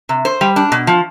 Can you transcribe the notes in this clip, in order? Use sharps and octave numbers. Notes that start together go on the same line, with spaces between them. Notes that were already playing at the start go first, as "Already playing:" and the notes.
C3
C5
G3
D4
B2
F3